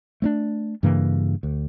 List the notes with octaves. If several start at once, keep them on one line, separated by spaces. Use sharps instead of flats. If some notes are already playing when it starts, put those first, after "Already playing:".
A3 C4 D4
G2 C#3 E3 A#3
D2